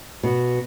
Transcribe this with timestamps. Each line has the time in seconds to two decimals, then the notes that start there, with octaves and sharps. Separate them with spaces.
0.23 B2